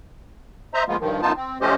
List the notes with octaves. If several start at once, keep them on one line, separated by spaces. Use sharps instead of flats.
C5 D#5 E5 A#5
F3 G#3 A#3 B3 F4
G2 D#3 F3
F#2 B3 D#4 F4 A5
C4
F3 A3 C#4 G4 C5 D#5